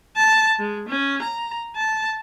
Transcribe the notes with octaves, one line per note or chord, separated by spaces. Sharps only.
A5
G#3
C#4
A#5
A5